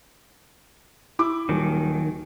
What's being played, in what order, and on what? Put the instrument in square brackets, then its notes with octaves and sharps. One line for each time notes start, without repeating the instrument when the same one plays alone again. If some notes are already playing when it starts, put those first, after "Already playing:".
[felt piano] E4 D6
[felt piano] D#1 [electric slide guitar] D#3 F#3